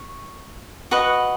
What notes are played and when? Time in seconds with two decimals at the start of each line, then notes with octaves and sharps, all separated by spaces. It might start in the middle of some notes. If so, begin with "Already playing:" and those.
Already playing: C#6
0.91 F#4 B4 D#5 F#5